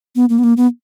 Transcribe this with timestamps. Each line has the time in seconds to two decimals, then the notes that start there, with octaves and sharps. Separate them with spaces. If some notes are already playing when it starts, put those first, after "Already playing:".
0.16 B3
0.29 A#3
0.39 B3
0.44 A#3
0.57 B3